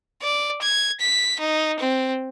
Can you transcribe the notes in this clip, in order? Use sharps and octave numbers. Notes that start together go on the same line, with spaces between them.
D5
G#6
B6
D#4
C4